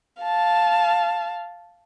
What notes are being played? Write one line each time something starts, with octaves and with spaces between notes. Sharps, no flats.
F5 A5